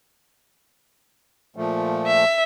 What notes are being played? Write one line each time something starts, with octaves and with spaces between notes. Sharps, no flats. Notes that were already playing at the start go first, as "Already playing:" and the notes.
A#2 F3 A3
E5